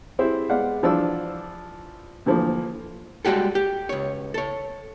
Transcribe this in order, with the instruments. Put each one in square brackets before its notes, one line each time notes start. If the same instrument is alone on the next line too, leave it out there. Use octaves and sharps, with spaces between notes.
[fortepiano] C4 E4 G4 G#4 C5
G#3 B3 D5 F5 F#5
E3 F3 D4 F4 E6
D2 E3 F3 A3 A#3
[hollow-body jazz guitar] G3 G#3 F#4 G4 A4
G4
C#2 C#5
A4 C#5